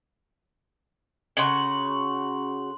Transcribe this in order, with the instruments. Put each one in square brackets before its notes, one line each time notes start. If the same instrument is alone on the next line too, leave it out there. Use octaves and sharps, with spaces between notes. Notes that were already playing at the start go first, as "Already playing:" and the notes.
[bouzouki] C#3 F#4 [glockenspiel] C6 F#7